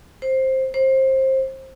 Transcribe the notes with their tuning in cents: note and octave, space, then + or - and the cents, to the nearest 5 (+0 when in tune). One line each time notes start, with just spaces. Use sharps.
C5 +10
C5 +20